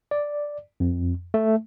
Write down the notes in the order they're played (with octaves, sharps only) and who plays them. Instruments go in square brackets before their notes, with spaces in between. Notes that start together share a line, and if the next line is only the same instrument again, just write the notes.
[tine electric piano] D5
F2
A3